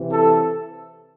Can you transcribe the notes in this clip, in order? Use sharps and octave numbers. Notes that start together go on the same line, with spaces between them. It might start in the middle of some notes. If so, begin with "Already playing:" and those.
Already playing: C3 E3
A4